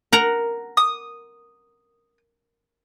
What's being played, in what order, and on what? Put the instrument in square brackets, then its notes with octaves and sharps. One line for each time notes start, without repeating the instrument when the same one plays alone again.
[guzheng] A#4 F#5 A#5
[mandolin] D#6